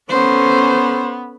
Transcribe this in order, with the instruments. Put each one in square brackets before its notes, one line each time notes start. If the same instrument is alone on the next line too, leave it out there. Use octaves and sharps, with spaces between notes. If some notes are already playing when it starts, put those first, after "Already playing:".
[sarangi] B3 [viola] C#4 A4 [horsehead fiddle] C5